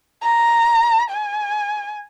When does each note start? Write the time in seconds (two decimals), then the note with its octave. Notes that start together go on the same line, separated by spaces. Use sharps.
0.23 A#5
1.12 G#5